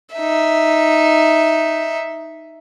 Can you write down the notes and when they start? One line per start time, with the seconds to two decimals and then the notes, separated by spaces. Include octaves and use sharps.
0.15 D#4 E5